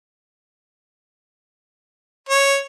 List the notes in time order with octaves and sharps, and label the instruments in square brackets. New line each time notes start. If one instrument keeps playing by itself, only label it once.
[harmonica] C#5